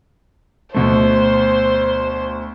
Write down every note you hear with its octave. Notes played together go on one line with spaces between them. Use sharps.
D2 B2 A3 C5